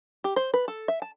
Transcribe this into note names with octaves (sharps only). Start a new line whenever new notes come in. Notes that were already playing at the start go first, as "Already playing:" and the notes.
G4
C5
B4
A4
E5
A5